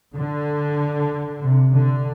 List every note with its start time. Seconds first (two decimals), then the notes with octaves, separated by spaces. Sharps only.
0.15 D3
1.41 C3
1.73 D3